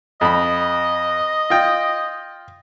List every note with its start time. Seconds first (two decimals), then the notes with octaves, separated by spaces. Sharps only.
0.21 F2 D#5 B5
1.50 F4 G5